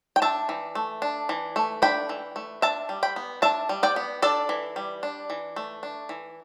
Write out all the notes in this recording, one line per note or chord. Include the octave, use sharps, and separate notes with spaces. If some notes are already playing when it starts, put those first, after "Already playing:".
G5
D4 E5 A5
E3
A3
D4
E3
A3
D4 G5 B5
E3
A3
D4 E5 A5
G3
G5 B5
B3
D4 E5 A5
G3
D5 G5
B3
D4 A4 D5
E3
G3
D4
E3
A3
D4
E3